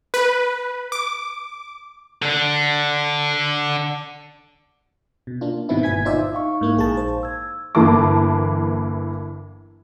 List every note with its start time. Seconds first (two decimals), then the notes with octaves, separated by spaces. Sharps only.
0.14 B4
0.92 D6
2.22 D3 D4
5.27 B2
5.41 A#3 D4 F4
5.69 G#2 B2 D#3 B3 C4 E4
5.83 G1 A#2 B4 G#5 G#6 B6
6.05 D#4 F4 C5 D5 E5
6.33 D#4 F5 C#6
6.61 G#2 A#3 E4
6.76 A#1 G#4 A5
6.97 C5
7.23 E6 G#6
7.75 G1 E3 A#3 A5 D6